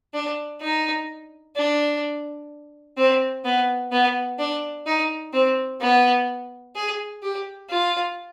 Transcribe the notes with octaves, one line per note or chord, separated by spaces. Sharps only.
D4
D#4
D4
C4
B3
B3
D4
D#4
C4
B3
G#4
G4
F4